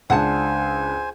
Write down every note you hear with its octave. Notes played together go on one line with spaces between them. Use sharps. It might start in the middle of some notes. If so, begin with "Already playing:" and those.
C#2 D4 C5 F#5 G#5 A5